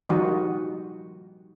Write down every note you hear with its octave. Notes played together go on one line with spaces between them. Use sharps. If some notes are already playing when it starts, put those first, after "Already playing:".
D#3 F3 G3 D#4 F#4